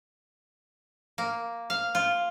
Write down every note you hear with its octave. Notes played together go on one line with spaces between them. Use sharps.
A#3
F5
F4